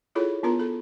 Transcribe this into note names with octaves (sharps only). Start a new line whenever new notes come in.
E4 F4 G#4 A4 C#5 B5
B3 D4 F4 A#4 A#5
A4 B5